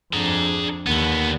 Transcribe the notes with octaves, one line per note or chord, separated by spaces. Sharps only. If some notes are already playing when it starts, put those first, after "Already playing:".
F2 D4 G#4 A#5
D#2 D3 B3